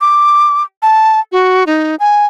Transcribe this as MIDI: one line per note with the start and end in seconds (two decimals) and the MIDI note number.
0.01 0.63 86
0.82 1.20 81
1.32 1.64 66
1.66 1.95 63
1.99 2.25 80